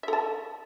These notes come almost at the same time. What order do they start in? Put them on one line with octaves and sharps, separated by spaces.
E5 A4 A5